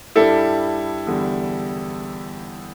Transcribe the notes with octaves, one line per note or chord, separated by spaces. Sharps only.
G2 G3 E4 A4
E2 D3 G3